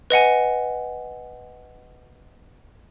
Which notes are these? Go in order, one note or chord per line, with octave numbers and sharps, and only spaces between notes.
B4 D#5 F#5 G#5